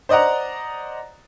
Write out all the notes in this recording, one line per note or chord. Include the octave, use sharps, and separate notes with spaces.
C5 D5 D#5 F#5 A#5